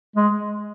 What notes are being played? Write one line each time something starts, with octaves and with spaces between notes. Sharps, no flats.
G#3